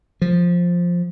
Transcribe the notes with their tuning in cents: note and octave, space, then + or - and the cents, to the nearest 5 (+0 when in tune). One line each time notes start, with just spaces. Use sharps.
F3 +5